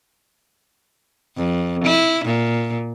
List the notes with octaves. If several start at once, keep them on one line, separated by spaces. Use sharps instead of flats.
F2
E4
A#2